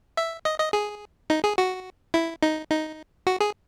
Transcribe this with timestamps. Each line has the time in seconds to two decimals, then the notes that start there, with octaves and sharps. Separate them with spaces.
0.17 E5
0.45 D#5
0.59 D#5
0.73 G#4
1.30 D#4
1.44 G#4
1.58 F#4
2.14 E4
2.43 D#4
2.70 D#4
3.27 F#4
3.40 G#4